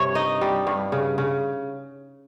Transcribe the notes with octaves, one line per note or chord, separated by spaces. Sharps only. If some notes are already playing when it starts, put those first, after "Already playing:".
Already playing: G2 C3 C#5
D#4 D#5
G3
G2
C#3
C#3